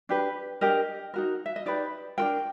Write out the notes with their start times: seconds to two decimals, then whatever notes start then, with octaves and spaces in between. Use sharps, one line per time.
0.09 D4 G4 B4
0.61 D4 G4 A#4 D#5
1.14 D#4 F#4 A#4
1.46 E5
1.56 D#5
1.66 D#4 G4 B4 D5
2.18 D4 F#4 A#4 G5